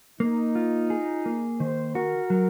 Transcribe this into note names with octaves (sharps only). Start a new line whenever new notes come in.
A#3 D#4
F4
G#4
A#3
D#3 C5
F#4 A#4
F#3